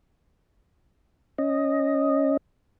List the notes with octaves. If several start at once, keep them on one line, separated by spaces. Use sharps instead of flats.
C#4 D#5